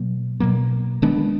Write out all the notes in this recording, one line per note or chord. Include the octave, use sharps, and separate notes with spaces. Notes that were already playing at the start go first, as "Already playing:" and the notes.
Already playing: B2 F#3 A#3
B2 F#3 A#3
D#3 G#3 B3 D4